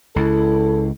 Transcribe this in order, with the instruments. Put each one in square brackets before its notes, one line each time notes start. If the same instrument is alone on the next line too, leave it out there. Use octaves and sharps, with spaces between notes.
[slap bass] C#2 [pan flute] E4 [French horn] A4